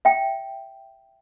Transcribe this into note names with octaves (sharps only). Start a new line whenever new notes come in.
E5 G5